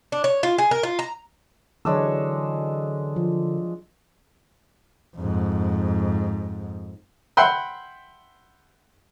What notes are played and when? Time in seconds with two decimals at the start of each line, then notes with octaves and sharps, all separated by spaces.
0.12 D4
0.24 C#5
0.43 F4
0.58 G#4
0.71 A#4
0.83 F4
0.99 A#5
1.85 D3 E3 F#3 G#3 D4 C#5 E6
3.16 F3
5.16 F2 G#2
7.37 E5 F#5 G5 B5 C6